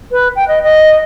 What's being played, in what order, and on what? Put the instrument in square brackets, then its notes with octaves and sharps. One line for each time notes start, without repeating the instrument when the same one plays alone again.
[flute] B4
G5
D#5
D#5